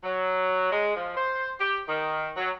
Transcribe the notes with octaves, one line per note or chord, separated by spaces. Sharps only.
F#3
G#3
F3
C5
G4
D#3
F#3